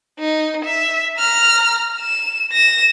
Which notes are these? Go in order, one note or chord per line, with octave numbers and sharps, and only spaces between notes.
D#4
E5
A#5 F6
E7
A#6 E7